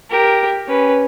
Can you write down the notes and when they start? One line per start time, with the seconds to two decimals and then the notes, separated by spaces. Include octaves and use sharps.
0.10 G4 A#4
0.68 C#4 B4